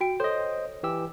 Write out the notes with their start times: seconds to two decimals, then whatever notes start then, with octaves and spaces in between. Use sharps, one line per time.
0.01 F#4 G5 D7
0.20 A4 C5 C#5 D#5
0.83 E3 G4 E6